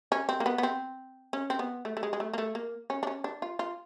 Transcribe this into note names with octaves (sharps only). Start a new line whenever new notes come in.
C#4
C4
A#3
B3
B3
C4
C#4
C4
B3
A3
A3
G#3
G#3
A3
A#3
A3
A#3
C#4
D4
C#4
D4
F4
F4